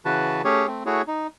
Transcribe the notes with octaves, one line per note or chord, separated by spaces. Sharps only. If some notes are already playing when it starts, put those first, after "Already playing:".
C#3 E3 F#4 B4 A5
A3 C#4 G4 G#4 C#5
A3 C4
A3 E4 F#4 G#4 C#5
D#4